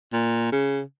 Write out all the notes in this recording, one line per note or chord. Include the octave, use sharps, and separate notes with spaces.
A#2
C#3